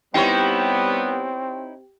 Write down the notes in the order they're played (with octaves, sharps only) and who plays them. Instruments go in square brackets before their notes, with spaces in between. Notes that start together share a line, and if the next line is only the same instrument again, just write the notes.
[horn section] G3 B3 [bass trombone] C4 [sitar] D#4 E4 C#5 [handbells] G4 G5